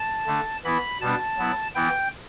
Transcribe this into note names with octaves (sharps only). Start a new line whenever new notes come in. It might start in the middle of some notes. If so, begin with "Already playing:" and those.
Already playing: A5
D3 A3 D4
E3 B3 E4 B5
B2 G3 B3 D4 A5
F#3 B3 E4
E3 B3 E4 G5